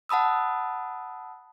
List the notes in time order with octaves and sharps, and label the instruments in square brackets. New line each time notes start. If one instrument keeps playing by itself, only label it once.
[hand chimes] F#5 A5 B5 D#6 E6